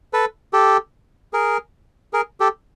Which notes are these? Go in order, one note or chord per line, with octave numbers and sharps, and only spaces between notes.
A4 B4
G4 A4
G#4 A#4
G#4 A#4
G4 A4